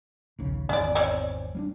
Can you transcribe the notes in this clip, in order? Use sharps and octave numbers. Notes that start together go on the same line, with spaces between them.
A#1 D#2 C#3
G#1 E2 D#3 C#4 D5
C4 C#4 D5
G3 C#4 D4